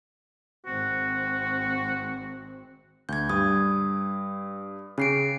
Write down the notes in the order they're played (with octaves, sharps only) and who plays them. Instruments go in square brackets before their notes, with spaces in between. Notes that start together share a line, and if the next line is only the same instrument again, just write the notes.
[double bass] G#1 C4 [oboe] F#4
[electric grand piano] D2 [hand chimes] G6 G#6
[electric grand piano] G2 [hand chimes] D#6
[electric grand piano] C#3 [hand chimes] C#4 C7 D7